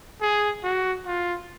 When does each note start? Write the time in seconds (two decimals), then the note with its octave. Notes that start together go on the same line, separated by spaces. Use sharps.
0.21 G#4
0.63 F#4
1.07 F4